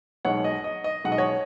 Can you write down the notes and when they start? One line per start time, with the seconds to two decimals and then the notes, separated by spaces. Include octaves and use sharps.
0.25 B1 B2 G#3 D#4 C#5 F#5
0.44 D#5
0.64 D#5
0.84 D#5
1.04 B1 B2 G#3 D#4 F#5
1.12 D#5
1.18 C#5 F#5